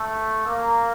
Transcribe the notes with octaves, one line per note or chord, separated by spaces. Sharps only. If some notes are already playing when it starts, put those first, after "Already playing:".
Already playing: A3
A#3